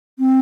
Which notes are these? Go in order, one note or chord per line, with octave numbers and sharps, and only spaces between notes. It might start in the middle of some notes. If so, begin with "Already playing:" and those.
C4